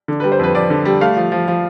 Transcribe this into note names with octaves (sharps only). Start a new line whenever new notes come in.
D3
G3 B4
C5
F2 B4
F2 D5
D3
G3
A3 F5
F3
F3
F3